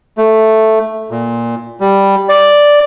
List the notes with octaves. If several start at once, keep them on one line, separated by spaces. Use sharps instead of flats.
A3
A#2
G3
D5